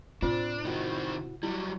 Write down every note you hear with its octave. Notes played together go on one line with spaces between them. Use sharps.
A2 C3 C4 D4 F4 C5
D#3 C4 E4 F#4
F#3 G3 E4